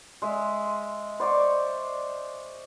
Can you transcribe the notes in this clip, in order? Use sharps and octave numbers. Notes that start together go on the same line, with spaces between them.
G#3 E5
C5 D5 C#6 D6